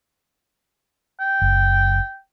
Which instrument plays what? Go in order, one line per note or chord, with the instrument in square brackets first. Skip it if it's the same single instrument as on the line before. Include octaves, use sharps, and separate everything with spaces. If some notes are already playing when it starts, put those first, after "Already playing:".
[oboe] G5
[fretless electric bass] F#1